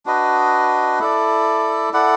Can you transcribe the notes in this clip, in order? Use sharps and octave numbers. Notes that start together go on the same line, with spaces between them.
D4 F#4 B4 D#5
E4 A4 D5
E4 A4 D5 F#5